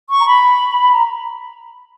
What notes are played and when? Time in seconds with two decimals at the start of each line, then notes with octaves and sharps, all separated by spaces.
0.09 C#6
0.19 A#5
0.26 B5
0.91 A#5